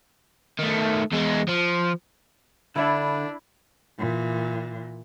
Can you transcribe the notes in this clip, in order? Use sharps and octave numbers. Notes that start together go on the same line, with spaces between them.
D#3 A3
E2 G#3
F3
D3 D4 E4 A4 E5 B5
A#2 E3